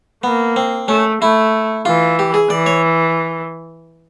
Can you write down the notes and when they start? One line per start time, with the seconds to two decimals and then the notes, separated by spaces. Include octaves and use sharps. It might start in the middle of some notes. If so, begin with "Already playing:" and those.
0.23 A#3 B3
0.56 C4
0.88 A3 C#4
1.22 A3 E4
1.85 E3 F4
2.19 G4
2.34 G#4
2.50 E3 D5
2.66 C#5